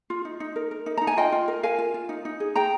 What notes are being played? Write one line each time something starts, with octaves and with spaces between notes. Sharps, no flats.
F4
D#4
D#4
A#4
A#4
D#4
D#4 A#5
G#5
F4 D#5 G5
F4
A#4
A#4 F5 G#5
F4
F4
D#4
D#4
G#4
G#4 G5 A#5